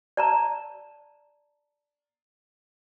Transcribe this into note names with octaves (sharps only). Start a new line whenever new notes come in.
D5 A5 A#5